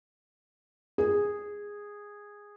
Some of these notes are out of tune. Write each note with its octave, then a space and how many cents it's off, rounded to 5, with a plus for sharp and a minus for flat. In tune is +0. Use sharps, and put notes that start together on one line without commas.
G#4 -10